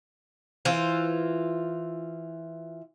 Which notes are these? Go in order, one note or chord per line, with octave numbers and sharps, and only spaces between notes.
E3 F4 C5